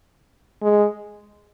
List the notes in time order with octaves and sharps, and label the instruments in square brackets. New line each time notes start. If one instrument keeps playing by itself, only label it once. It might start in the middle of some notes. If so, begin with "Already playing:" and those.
[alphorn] G#3